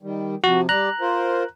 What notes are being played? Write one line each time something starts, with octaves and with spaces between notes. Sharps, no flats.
D#3 G3
C3 F3 F#4
G3 D5 A#5 F#6
F4 A#4 C5